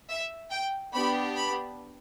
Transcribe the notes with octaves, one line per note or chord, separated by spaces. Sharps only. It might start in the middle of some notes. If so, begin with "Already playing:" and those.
E5
G5
B3 D4 G4 B5
B5